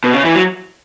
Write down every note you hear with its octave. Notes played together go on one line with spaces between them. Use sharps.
B2
C#3
E3
F#3